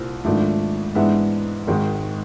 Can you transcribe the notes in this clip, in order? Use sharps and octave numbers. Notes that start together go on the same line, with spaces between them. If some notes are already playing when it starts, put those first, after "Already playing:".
Already playing: C2 A#2 G3 C4
G#1 G#2 F3 A3 D4
G#2 E3 G#3 B3 D4 E5 F#5
G#1 G#2 D#3 G#3